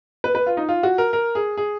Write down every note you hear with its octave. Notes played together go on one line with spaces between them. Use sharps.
B4
B4
F4
D#4
F4
F#4
A#4
A#4
G#4
G#4